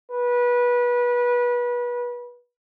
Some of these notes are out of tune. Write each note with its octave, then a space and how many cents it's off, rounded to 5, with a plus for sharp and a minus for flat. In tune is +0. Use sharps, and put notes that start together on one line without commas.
B4 -25